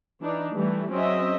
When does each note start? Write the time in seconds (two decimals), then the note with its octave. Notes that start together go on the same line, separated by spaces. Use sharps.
0.21 E3 D4 D#4
0.53 E3 G3 A3
0.92 F#3 C4 C#4 G#4 D#5 E5